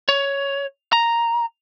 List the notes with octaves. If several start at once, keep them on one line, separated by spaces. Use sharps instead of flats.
C#5
A#5